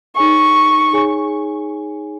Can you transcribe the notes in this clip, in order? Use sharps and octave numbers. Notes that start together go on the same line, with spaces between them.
D#4 G#4 C#5 G#5 C#6
D#4 G#4 C#5 G#5